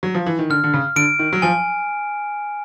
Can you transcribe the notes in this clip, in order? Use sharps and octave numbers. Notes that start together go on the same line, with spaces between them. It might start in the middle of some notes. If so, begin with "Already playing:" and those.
F#3
F3
E3
D#3
D3 F6
D3
C#3
D3 D7
D#3
F#3
F3 G#5